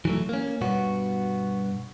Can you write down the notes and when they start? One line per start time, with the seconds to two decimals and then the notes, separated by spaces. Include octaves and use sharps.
0.05 E3 F#3 A3
0.29 A#3 C#4
0.61 G2 B2 B3 F#4